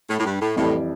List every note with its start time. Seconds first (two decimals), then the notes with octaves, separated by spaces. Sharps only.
0.09 A2
0.19 A2
0.25 G2
0.40 A2
0.56 F2 A2 E3 G3